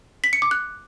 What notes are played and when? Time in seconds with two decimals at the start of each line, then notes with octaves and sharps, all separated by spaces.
0.24 B6
0.33 C#7
0.42 D6
0.51 F#6